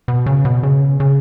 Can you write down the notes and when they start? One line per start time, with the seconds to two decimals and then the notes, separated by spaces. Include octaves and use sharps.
0.08 B2
0.26 C#3
0.45 B2
0.63 C#3
1.00 C#3